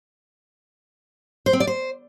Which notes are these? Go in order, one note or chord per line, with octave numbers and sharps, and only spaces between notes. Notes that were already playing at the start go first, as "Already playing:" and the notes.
C5
C4
D5
C5